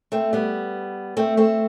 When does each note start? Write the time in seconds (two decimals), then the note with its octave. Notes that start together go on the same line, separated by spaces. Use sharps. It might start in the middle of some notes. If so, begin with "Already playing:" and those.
0.12 A3 C4
0.33 G3 B3
1.17 A3 C4
1.37 A3 C4